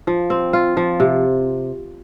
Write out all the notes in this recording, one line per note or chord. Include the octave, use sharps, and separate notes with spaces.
F3
C4
F4
F3
C3